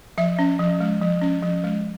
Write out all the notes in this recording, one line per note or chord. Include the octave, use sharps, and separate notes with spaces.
F3 E5
C#4
F3
G#3
F3
C#4
F3
G#3